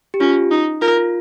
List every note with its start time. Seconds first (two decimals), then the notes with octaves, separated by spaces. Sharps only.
0.14 G4
0.20 C#4 F4
0.51 D#4
0.82 F4 A#4
0.97 F4